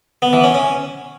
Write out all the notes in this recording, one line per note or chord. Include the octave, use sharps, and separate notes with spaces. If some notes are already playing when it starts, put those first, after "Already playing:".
B3
E3
C#4
C#4